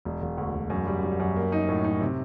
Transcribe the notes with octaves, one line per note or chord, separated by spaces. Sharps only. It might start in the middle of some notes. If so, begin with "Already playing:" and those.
E1
E1
D2
E1
F#2
G3
G3
F#2
A#3
D#4
A2
D#4
C3